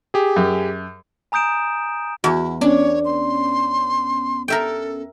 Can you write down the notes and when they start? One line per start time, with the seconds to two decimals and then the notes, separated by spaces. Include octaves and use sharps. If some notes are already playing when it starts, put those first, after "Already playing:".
0.14 G4 G#4
0.36 F#2
1.32 G#5 A#5 D#6 G6 D7 E7
2.24 E2 E4 F#4
2.61 B3 C#4 D4 C#5
3.05 C6
4.48 A4 A#4 E5 G5